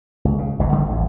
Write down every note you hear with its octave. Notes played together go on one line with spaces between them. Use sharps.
C#2
C#3
G1 D2 G2 A#2
D3 G3 A3
A1 D2